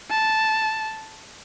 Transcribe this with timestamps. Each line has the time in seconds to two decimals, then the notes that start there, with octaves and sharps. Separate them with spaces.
0.10 A5